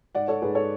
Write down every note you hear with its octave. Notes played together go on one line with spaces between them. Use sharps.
G#2 D5 F#5
A4 C#5
G#2 G#4 B4
A4 C#5